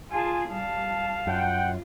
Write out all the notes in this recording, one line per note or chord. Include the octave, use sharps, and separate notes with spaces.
F4 G#4 G#5 A5
G3 F5 A5
F#2 F4 F#5 G5